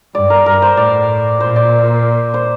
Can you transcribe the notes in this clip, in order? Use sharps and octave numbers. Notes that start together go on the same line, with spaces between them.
G2 D5
A#4
G2 A#4
C5
A2 D5
A#2 C5
D5
C5